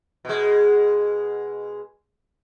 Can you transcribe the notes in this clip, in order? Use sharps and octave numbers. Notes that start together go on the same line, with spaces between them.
B2 G#3